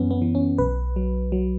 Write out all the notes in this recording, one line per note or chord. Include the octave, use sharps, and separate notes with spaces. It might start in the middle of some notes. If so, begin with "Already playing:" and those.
Already playing: F#2 E3 B3 C#4
B3
E3
C#4
B1 B4
F#3
F#3